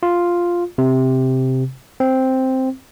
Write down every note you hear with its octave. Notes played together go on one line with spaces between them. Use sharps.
F4
C3
C4